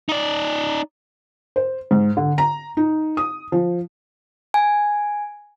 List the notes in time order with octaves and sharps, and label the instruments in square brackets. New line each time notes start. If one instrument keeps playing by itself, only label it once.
[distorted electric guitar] D#4 D5
[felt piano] C5
G#2
D3
A#5
D#4
D#6
F3
[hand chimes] G#5